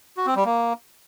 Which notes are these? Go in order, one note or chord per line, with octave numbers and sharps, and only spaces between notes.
F#4
C4
G3
A#3